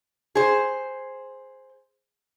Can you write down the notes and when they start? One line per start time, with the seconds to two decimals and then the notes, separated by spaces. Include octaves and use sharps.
0.35 G#4 C5